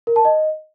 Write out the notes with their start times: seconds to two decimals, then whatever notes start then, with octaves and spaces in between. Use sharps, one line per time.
0.07 A#4
0.16 A5
0.25 D#5